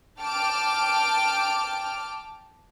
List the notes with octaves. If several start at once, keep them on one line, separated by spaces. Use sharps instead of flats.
G5 A5 D6 F6 D7